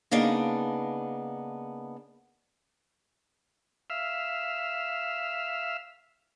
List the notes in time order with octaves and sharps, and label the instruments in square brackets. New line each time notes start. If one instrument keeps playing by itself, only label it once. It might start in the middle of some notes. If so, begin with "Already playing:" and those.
[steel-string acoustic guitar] C#3 A#3 B3 D4 D#4
[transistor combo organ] E5 F5